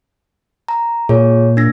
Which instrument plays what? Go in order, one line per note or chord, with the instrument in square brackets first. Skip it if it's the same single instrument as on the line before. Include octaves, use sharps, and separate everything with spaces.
[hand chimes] A#5
[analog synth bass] A#2 [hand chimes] G#4 C#5
[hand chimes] D4 A#6